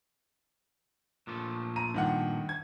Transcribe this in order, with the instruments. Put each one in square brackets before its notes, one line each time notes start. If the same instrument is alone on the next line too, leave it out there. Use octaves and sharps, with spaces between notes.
[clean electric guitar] A#2 F3 A3
[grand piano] A#5 D#7
G2 D#3 F#5
G#6